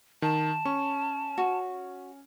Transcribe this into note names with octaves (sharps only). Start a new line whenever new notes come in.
D#3 A5
C#4 C#6
F#4